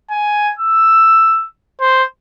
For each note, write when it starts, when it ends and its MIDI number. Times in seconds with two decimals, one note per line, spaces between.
0.11 0.52 80
0.59 1.46 88
1.81 2.04 72